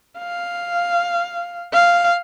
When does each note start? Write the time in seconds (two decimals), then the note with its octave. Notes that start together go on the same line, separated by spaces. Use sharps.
0.19 F5
1.74 F5